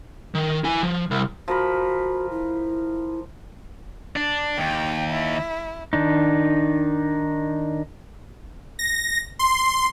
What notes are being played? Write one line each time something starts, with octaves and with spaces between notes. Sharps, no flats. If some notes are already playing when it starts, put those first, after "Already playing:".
D#3
E4 G#5
F3
C2
F3 F#4 A#4 B5
E4
D4
D#2 G5
E4
D#3 D4 D#4
A#6
C6